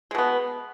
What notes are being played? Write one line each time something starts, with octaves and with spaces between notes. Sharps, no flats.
B2 G#3 B3